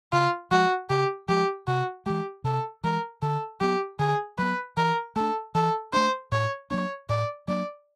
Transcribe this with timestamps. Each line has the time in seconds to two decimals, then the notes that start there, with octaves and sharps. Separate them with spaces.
0.12 C#3 F4
0.51 F3 G#3 F#4
0.89 C#3 G4
1.29 F3 G#3 G4
1.68 C3 F#4
2.06 E3 G#3 G4
2.44 C3 A4
2.84 E3 G#3 A#4
3.22 D3 A4
3.60 F#3 B3 G4
3.99 D3 G#4
4.38 F#3 B3 B4
4.77 E3 A#4
5.16 A3 D4 A4
5.55 E3 A4
5.93 A3 D4 C5
6.32 A2 C#5
6.71 F#3 A#3 D4 C#5
7.09 A2 D5
7.48 F#3 A#3 D4 D5